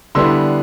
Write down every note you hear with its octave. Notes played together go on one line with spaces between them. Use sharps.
D3 G3 B3 E4 C6 E6